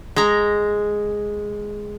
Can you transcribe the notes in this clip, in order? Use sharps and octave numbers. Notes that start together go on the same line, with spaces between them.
G#3 A#5